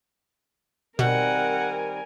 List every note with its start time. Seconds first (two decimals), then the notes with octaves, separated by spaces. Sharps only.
0.99 B2 D#3 G3 C4 A#4 F#5 G#5